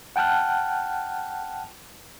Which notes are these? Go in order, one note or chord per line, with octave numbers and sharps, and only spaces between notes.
F#5 G5 A5 F6 F#6